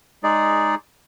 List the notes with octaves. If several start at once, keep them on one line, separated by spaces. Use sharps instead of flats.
G#3 D#4 G#4 D5